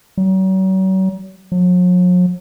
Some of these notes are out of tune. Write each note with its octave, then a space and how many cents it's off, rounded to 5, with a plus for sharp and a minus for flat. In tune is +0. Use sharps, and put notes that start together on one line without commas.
F#3 +40
F#3 -45